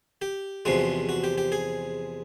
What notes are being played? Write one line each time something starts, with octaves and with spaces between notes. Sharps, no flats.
G4
E2 C3 F3 G#3 F#4
F#4
G4
G4
G#4